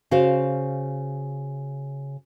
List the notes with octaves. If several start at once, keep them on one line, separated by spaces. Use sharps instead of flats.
C#3 F#4 C5 F5